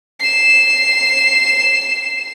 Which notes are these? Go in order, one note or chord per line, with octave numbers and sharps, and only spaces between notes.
C7 E7